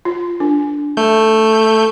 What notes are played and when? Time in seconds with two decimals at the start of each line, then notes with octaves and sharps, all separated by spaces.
0.05 F4
0.40 D4
0.97 A3 G6